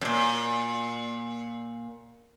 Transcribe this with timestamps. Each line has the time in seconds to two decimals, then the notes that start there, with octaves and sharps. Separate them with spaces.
0.01 F#2 A#2